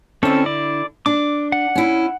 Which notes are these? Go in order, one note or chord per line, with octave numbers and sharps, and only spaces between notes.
D3 C4 C#4 E4 A4
D5
D4 D6
F#5
C#4 E4